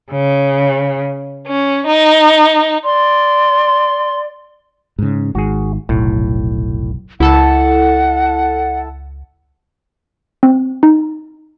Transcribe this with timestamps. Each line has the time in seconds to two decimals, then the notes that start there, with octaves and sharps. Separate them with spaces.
0.11 C#3
1.47 C#4
1.87 D#4
2.83 D5 C6
4.99 G#2 C#3
5.35 G#1 G#2 D#3 F#4 G#4
5.89 F1 B1 A2
7.20 C#2 E4 A4 F#5 A5
10.43 C4
10.83 D#4